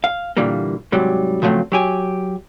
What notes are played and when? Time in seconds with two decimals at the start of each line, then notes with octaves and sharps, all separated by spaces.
0.04 F5
0.37 A#2 D3 E3 G3 A#3
0.92 G#2 C3 F#3 G3
1.42 C#3 F3 F#3 G#3 A3 C4
1.72 F#3 G4 G#5